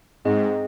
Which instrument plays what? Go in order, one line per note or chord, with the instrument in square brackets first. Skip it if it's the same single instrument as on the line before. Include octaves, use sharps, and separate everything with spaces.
[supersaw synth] G#2 [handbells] C4 G#4 D#5